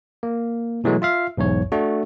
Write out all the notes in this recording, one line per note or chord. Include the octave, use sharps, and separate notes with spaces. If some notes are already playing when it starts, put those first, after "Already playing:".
A#3
B2 E3 F#3 G#3 A3
F4 E5 F5
B1 E2 G#2 C#5
A3 D4 F#4